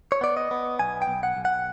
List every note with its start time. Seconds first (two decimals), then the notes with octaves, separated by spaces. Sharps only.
0.12 C#5
0.21 B3 D5
0.37 D#5
0.51 B3
0.79 B1 G#5
1.02 G5
1.08 B1
1.23 F#5
1.37 B1
1.45 F#5